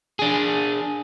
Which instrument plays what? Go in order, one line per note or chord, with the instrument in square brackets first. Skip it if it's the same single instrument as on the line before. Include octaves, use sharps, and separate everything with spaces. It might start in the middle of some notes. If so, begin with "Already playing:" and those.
[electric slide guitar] D4 G#4